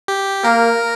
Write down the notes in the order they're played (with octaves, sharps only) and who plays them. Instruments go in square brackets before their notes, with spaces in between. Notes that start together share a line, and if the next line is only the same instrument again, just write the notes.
[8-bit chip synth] G4
[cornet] A#3 [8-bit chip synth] A#4